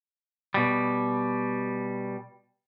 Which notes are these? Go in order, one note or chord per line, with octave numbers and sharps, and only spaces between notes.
B2 G3